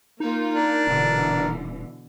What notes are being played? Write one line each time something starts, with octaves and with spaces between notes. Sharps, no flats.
A#3 D#4 F4
D4 A#4
D#1 B2 D3 E3